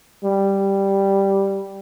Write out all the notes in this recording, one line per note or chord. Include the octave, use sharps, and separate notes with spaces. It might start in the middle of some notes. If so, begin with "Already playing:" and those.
G3